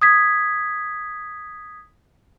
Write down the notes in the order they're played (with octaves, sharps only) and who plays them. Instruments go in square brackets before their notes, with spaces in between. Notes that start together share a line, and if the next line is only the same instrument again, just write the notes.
[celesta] D#6 G#6 B6